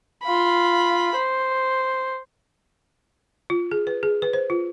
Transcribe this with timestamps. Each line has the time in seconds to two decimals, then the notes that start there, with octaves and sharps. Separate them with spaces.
0.23 F4 B5
1.16 C5
3.50 F4
3.71 G#4
3.87 B4
4.03 G#4
4.22 B4
4.33 C5
4.50 F4